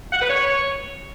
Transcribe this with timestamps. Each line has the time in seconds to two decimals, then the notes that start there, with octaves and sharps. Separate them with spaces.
0.12 F#5
0.21 B4
0.29 C#5